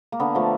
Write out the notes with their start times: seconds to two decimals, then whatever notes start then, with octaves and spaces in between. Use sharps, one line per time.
0.12 A#3
0.20 D3 B3
0.35 F3 A3